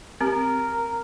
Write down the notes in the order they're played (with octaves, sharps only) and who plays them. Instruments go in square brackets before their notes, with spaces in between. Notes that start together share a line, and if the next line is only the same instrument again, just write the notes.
[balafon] C4 G4 [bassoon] A#4